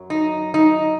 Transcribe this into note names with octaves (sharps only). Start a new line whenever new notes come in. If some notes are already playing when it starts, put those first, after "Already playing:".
Already playing: F#2 F#3
D#4
D#4